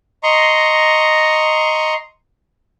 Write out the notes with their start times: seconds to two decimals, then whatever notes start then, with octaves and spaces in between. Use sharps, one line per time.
0.23 D#5 A#5 C6 C#6